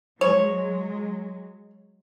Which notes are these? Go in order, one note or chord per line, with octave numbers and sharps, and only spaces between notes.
F#3 G#3 C#5